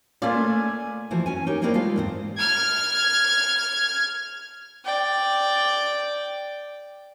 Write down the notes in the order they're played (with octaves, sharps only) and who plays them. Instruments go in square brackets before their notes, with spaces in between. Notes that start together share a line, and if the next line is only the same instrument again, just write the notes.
[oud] A3 D5 [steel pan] A#3 C#4 F4 [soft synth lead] G#5
[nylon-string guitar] E3 F3 A3 E4 F#4
C#4 G#5
D#4 G4 A#4 C#5
A3 A#3 C4 E4 A#4 D5
G#3 A3 F4 A4 F5
E2 G#2 C4
[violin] F6 G#6
[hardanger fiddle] D5 G5